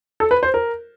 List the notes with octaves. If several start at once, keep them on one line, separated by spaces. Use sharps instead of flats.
A4
B4
C5
A#4